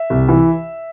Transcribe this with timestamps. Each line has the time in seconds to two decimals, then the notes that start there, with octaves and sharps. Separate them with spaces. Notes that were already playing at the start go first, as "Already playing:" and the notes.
Already playing: E5
0.10 C2
0.28 E3